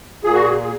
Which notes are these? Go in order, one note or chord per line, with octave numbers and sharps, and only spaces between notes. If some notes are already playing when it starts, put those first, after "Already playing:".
A#2 G#4
F#4
G#4
G#4